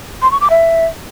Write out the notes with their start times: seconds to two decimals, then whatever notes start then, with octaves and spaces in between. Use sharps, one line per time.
0.22 C6
0.31 C#6
0.41 D6
0.50 E5